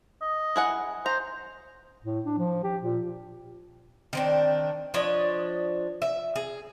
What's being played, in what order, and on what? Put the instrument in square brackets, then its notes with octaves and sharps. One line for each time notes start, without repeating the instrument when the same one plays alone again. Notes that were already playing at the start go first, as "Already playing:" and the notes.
[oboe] D#5
[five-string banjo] E4 G#4 F#5
[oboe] C5 [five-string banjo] A#5
[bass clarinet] A2
D4
F3
G4
A#2
[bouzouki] D#3 C4 D4
F3 D4 C#5 D#5
E5
G#4